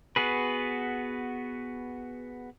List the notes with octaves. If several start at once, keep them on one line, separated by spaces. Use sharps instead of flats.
B3 F#4 G#4 B4